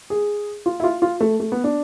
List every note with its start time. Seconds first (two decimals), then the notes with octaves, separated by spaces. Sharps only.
0.10 G#4
0.66 F4
0.80 E4
0.84 F4
1.02 F4
1.21 A3
1.40 A3
1.52 B3
1.64 D4